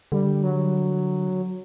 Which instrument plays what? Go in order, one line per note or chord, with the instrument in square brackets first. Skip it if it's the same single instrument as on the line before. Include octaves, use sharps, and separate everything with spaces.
[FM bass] D3 [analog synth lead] G3
[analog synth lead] F#3